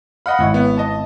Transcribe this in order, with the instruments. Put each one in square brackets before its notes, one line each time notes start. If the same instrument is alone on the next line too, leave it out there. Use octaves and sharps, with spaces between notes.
[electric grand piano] D#5 F#5 B5 [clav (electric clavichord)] F5
[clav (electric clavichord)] G#1 E4 C#5
[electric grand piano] B3
D#5 A5